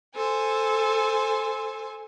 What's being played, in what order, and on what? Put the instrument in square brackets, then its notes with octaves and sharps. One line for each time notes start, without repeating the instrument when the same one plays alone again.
[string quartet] A4 C5 G#5